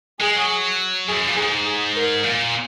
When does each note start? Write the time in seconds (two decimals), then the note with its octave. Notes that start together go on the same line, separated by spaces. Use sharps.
0.21 G#3 G#4
0.36 F#3
1.08 F#2 G#4
1.28 A#2
1.36 G#2 G#4
1.65 G#4
1.95 A#4
2.24 A#2